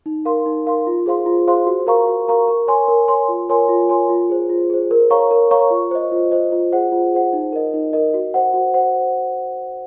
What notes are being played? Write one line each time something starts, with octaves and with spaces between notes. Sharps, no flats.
D#4
A#4 F5 C6
D#4
A#4 F5 C6
F4
G#4 C5 F5 C6
F4
G#4 C5 F5 C6
F#4
A#4 F5 A#5 C#6
F#4
A#4 F5 A#5 C#6
A#4
C#5 G#5 C6
A#4
C#5 G#5 C6
F4
A#4 C#5 G#5 C6
F4
A#4 C#5 G#5 C6
F4
G#4 C5
F4
G#4 C5
A#4
C#5 F5 A#5 C#6
A#4
C#5 F5 A#5 C#6
F4
C5 D#5
F4
C5 D#5
F4
G#4 C5 F#5
F4
G#4 C5 F#5
D#4
A#4 D#5
D#4
A#4 D#5
F#4
C5 F#5
F#4
C5 F#5